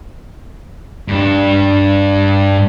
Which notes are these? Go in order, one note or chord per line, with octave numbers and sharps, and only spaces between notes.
G2 D4